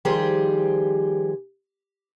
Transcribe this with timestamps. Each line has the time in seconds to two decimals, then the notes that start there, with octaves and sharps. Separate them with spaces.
0.05 D#3 F3 G3 G4 G#4 C5